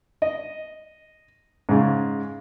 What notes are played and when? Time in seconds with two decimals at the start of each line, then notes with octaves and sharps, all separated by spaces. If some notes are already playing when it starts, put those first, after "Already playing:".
0.22 D#5
1.69 G#2 C#3